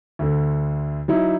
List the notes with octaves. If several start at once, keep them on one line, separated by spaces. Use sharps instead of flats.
D2 D3
F#3 D#4 E4